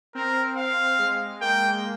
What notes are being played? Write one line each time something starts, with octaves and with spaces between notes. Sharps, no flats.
C4 A#4
F5
G#3
A#3 G5